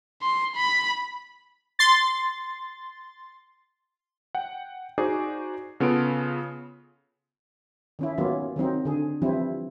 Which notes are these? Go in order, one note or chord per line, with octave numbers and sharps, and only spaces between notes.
C6
B5
C6 A6
F#5 G5
D#4 F#4 G#4 C5 D5 D6
C#3 B3 F4 A4 D7
D#3 C#4 E4
D#3 F#3 A#3 B3 C#4 F4
D#3 F#3 C4 D#4
D3 G#4
E3 F3 G3 C4 E4